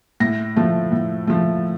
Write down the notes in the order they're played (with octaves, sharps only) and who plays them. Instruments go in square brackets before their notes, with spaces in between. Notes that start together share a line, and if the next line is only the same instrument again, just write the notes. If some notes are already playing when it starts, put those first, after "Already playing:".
[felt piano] A2 A#6
F3 A3
A2
F3 A3